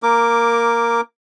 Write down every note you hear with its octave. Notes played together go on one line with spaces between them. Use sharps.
A#3 A#4 D6